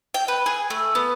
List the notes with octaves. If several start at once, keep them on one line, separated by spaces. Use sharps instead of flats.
G5
B4
G#4
A3
B3